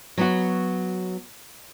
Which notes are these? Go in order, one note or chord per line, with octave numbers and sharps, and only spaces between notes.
F#3 B3 F#4